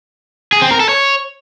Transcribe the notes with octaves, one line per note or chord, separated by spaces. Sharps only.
G#4
C4
A#4
A4
C#5